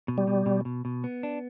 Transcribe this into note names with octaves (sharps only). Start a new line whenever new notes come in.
B2
G3
B2
B2
B2
B2
B3
D4